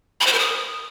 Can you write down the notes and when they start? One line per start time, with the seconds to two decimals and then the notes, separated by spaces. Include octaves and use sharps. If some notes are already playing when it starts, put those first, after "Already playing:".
0.21 B5
0.27 C5
0.33 A#4
0.39 D#6